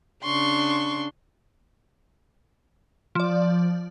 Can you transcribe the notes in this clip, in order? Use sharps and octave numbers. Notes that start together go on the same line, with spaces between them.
C#3 D4 C6 C#6
F3 D5